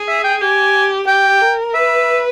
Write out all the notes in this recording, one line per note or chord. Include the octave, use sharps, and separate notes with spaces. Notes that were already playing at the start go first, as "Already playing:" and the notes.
Already playing: G#4
E5
G5
G4 G#5
G4 G5
A#4
B4 E5